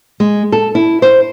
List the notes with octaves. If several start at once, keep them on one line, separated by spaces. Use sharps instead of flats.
G#3
A4
E4
C5